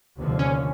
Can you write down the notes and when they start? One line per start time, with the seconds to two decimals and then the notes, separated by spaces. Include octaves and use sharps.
0.16 F1 D#2 D3 F3
0.39 C#4